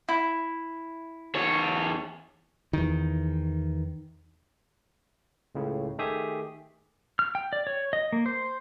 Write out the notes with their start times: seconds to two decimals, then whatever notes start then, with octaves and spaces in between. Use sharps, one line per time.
0.09 E4
1.35 E2 C#5
2.73 E2 D#3
5.55 C#2 A2 C#3
5.98 D#3 A3 G4 G#4 E5 D#6
7.19 F6
7.35 G5
7.53 D5
7.67 C#5
7.93 D#5
8.13 A#3
8.26 C5